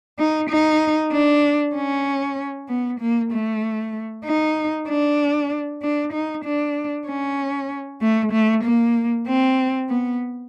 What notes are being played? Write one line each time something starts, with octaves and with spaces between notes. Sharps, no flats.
D#4
D#4
D4
C#4
B3
A#3
A3
D#4
D4
D4
D#4
D4
C#4
A3
A3
A#3
C4
B3